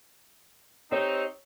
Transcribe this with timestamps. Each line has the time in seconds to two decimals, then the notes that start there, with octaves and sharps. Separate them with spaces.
0.92 C4 D#4 G4 C#5